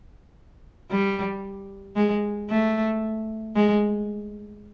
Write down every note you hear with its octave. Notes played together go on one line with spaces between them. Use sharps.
G3
G#3
A3
G#3